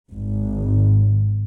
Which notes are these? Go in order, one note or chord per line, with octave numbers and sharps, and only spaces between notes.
G#1